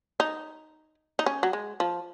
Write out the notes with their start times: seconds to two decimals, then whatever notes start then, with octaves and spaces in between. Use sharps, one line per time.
0.20 D#4
1.19 D#4
1.26 C#4
1.43 F#3
1.53 G#3
1.80 F3